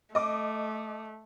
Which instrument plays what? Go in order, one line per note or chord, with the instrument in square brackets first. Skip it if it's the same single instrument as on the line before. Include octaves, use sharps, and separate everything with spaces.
[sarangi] A3 [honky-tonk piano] D#5 D6